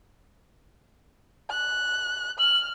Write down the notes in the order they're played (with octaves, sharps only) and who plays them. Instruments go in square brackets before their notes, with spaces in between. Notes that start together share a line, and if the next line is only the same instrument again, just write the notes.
[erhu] F#6
[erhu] F6 [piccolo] F#7